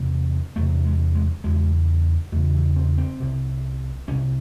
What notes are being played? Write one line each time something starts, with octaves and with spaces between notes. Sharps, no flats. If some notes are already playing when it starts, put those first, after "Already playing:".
Already playing: E2 C3
E2 C3 A3
G#3
G#3
E2 C#3 G#3
E2 C#3 A3
E3
C4
C4
C2 C3
C2 C3 C#4